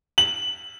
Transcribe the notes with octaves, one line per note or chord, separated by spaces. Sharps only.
F#7